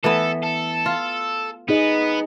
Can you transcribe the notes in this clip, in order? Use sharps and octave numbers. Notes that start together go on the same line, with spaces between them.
E3 A3 B3 A4
A4
F4
B3 D#4 G#4 D#5